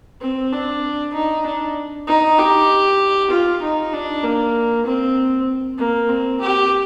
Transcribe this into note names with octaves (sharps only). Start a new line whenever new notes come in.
C4
D4
D#4
D4
D#4
G4
F4
D#4
D4
A#3
C4
A#3
C4
G4